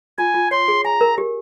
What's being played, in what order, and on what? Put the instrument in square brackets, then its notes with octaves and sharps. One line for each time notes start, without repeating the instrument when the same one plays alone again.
[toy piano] F4 [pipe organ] G#5
[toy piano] F4
[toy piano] C#5 [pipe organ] C6
[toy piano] G#4
[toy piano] G#5 [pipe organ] A#5
[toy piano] A#4
G4